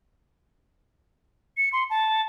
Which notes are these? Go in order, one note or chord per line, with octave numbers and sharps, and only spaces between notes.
C#7
C6
A5